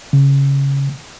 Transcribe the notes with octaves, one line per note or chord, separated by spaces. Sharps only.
C#3